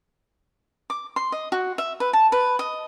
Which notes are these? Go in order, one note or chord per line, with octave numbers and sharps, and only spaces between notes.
D6
C6
D#5
F#4
E5
B4
A5
B4
D#5